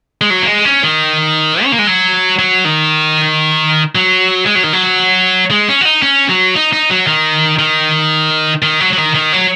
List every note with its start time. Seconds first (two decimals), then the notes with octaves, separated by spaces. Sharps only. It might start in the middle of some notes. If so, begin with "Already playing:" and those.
0.21 G#3
0.30 F#3
0.42 A#3
0.47 G#3
0.65 C#4
0.83 D#3
1.64 C#4
1.72 A#3
1.79 G#3
1.87 F#3
2.39 F#3
2.65 D#3
3.95 F#3
4.46 G#3
4.55 F#3
4.64 D#3
4.73 F#3
5.51 G#3
5.69 C#4
5.81 F#4
5.85 D#4
6.02 C#4
6.29 F#3
6.55 D#4
6.73 D#4
6.90 F#3
7.07 D#3
7.59 D#3
8.63 D#3
8.80 F#3
8.93 F#3
8.97 D#3
9.15 D#3
9.33 F#3